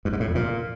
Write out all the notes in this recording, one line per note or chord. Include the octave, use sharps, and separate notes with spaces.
G2
G#2
A2
F2
A#2